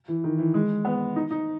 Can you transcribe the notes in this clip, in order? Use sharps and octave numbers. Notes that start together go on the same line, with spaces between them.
E3
D#3
E3
G#3
B3
D#4
D#4